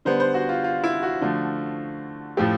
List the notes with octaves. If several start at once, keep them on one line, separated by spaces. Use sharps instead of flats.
D3 G3 B3 C5
C5
F#4
F4
F4
E4
F#4
D3 F3 A3
A2 F3 A3 G4